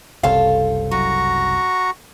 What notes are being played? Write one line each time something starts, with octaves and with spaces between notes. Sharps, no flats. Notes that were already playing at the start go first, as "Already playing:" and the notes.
F#1 C2 A4 C5 C#5 F5
F#2 F#4 A#5 C#6